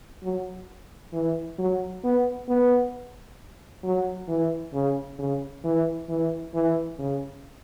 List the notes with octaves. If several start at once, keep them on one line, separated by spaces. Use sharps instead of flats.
F#3
E3
F#3
B3
B3
F#3
E3
C#3
C#3
E3
E3
E3
C#3